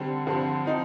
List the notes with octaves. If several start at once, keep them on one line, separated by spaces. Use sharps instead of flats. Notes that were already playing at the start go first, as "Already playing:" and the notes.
Already playing: D3 G3 C4
G2 D3 F3 C4
F3 C4 D#4